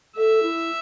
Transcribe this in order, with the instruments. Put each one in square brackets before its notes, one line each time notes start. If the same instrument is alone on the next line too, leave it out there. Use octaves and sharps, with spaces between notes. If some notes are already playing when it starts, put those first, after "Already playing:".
[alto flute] A4 [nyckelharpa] E5
[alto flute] E4